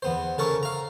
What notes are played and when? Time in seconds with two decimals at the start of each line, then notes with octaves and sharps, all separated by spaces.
0.02 E2 B3 C5
0.38 C#3 A4 A#4 C#6
0.63 F5 A#5